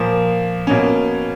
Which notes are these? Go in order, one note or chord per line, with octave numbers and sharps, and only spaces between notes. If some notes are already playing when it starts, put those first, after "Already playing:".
Already playing: A#2 F3 A#3
B2 A#3 C#4